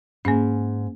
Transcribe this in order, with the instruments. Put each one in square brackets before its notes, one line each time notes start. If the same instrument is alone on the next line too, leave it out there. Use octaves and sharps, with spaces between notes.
[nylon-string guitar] G#2 [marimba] A#3 C#4